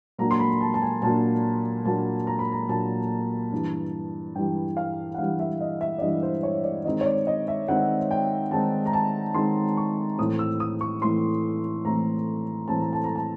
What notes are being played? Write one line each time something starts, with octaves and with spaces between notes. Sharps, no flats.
A#2 F#3 A#3 D4 A#5
C6
B5
A5
A5
G#5
A#2 F#3 A#3 D4 A5
A#2 F#3 A#3 D4 A5
A#5
B5
A#5
A#2 F#3 A#3 D4 A5
G2 E3 G3
G2 E3 G3 G5
F5
F#5
G2 E3 G3 F5
E5
D#5
E5
D5
G2 E3 G3 D#5
C5
C#5
D5
D#3 G#3 C4 D#4 D#5
C#5
D5
D#5
E5
D#3 G#3 C4 D#4 F#5
G5
D#3 G#3 C4 D#4 A5
A#5
A5
D#3 G#3 C4 D#4 C6
C#6
A2 E3 A3 C4 D#6
E6
D#6
C#6
A2 E3 A3 C4 C6
A2 E3 A3 C4 A#5
A2 E3 A3 C4 A5
A#5
A5
A#5
A5